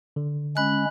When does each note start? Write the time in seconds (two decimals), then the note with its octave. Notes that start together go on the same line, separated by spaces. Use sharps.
0.16 D3
0.57 G#3 C#4 B5 F#6